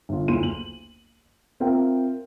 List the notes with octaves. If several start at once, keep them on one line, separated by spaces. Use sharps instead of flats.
G1 F4
F#1 D2 E4 F4 C6 D#7
F#7
C4 F4 A#4 E5 G5